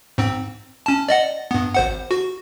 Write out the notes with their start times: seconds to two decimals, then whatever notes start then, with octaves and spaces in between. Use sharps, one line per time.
0.18 G#2 C4
0.86 C#4 A5
1.09 D5 D#5 F#5
1.51 G2 B3
1.74 G#1 C5 F#5
2.11 F#4